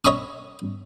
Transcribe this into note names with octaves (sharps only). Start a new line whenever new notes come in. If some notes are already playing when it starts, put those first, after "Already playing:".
C#5 D#5 B5 C#6 D#6